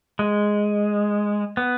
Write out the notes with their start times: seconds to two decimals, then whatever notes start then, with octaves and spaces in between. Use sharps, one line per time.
0.19 G#3
1.57 B3